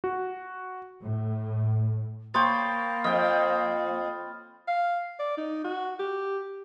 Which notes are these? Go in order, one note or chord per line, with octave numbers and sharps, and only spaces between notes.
F#4
A2
A#3 C5 C#5 G5 B5 D#6 A6
F2 D#5 G5 F6
F5
D5
D#4
F#4
G4